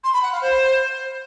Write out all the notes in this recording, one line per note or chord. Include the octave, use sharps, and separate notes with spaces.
C6
B5
F#5
F5
C5